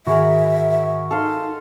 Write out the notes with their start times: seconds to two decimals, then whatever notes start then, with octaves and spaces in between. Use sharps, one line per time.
0.07 G#2 D#3 F#4 G#4 A#4 E5 B5
1.11 D#4 A4 F5 C6